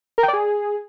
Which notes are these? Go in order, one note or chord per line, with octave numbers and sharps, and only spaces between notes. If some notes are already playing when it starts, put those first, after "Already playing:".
A#4
G5
D5
G#4